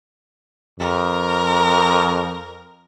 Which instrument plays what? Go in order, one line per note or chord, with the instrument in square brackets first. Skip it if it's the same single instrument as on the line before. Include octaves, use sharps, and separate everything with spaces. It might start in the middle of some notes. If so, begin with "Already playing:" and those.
[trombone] F2 [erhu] A#4